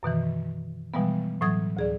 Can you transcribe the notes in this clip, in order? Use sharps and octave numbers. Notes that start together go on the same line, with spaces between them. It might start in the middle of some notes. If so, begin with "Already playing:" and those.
F#2 B2 D#3 E3
B2 E3 F3 G3 G#3 B3
A2 E3 F#3 D#6 G#6
D2 G#4 D5